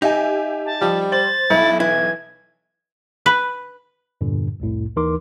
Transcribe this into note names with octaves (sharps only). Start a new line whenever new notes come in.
D#4 G4 E5 G#5
A5
F3 G3
C5 A6 F#7
B1 E4
E3 E4 G#6
B4
E2 G2 A#2 D3
C2 F2 A2
D#2 E3 D#4 A#4 C6 D6